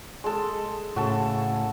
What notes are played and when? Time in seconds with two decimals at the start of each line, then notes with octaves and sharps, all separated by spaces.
0.24 G#3 A4
0.96 A2 C#3 F#4 A4